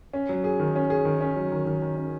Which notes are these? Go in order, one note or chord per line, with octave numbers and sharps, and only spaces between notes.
C#4
F#3
G#4
D#3
C#4
G#4
D#3
C#4
F#3
D#3
D#3
D#3
C#4